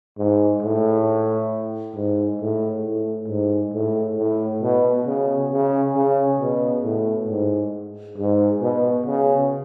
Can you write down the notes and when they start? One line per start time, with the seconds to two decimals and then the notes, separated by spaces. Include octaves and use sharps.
0.18 G#2
0.62 A2
1.95 G#2
2.41 A2
2.84 A2
3.28 G#2
3.73 A2
4.18 A2
4.62 B2
5.06 C#3
5.51 C#3
5.96 C#3
6.40 B2
6.84 A2
7.29 G#2
8.17 G#2
8.62 B2
9.06 C#3